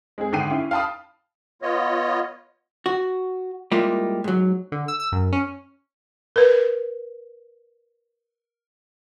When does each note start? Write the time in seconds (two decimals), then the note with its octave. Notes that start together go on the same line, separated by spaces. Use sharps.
0.18 G#3 C4 G#4
0.32 G#1 D3 G5 C7 D#7
0.50 C#4 E4
0.71 F5 G5 A5 B5 D#6
1.62 B3 F4 C#5 D#5
2.86 F#4
3.72 G3 G#3 A#3 E4 F4 G4
4.24 G#2 F#3
4.72 D3
4.88 E6
5.00 E6
5.12 F#2
5.32 C#4
6.36 A#4 B4